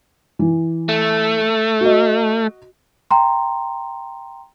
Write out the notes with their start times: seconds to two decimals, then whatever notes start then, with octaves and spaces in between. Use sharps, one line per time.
0.39 E3
0.89 A3
1.81 F#4 D#5
3.11 G5 A#5 C6